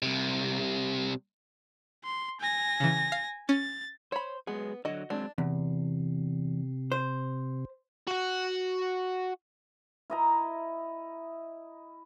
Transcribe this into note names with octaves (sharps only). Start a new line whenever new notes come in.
C2 C3
C6
G#5 A#6
C#3 E3
F5
C#4 A6
C5 C#5 B5
F#3 G#3 B3 G#4
D3 F#3 F#4 D#5
F#3 G#3 C4 D4
E2 C3
C5
F#4 F#5
E4 D#5 A#5